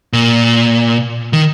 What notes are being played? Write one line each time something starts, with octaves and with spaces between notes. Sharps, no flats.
A#2
D#3